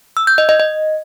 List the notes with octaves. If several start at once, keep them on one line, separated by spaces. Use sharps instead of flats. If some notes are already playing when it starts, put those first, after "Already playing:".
E6
G6
D#5
D#5
D#5